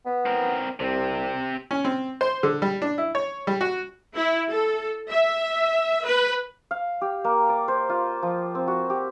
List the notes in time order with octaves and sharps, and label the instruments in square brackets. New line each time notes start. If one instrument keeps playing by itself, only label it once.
[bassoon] B3
[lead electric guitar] C4 A#4
[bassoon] C2 [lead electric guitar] C3 C4
[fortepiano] C#4
C4
C5
D3
G3
D4
E4
C#5
G3
F#4
[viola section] E4
A4
E5
B4
[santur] F5
G4
A#3
D5
C5
F4
F3
C4
F#4
G4